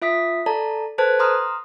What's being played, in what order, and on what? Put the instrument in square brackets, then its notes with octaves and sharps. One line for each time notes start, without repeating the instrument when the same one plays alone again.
[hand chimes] F4 E5 D#6 B6
A4 D5 A5 A#5
A4 B4 C5 A5 F#6 G#6
A#5 C6 D#6 F6